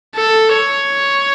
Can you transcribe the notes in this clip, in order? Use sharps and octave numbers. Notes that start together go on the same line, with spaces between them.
A4
C#5